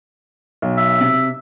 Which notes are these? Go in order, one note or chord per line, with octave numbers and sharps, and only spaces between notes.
B1
E5
C3